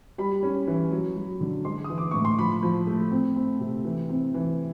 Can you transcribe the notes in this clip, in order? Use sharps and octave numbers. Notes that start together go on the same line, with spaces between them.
G3 B5
C#4
E3
F#3
F#3
D3
G#3 C6
D#6
E3
D6
A2 C#6
C6
F3 B5
F3
A3
C4
C4
C3
E3
C4
E3